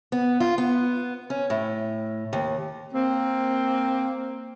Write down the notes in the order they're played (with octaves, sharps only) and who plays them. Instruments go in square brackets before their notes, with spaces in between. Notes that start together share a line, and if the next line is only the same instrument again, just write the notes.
[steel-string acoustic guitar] B3
F4
B3
C#4
A2
D#2
[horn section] A#3 C4